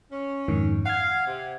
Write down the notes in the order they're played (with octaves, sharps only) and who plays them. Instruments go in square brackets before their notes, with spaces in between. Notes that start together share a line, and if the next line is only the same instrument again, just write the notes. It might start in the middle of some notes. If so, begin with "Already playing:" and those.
[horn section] C#4
[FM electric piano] F2 G#2 D#3
[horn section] F5 [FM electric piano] F#5 G#6
[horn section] C3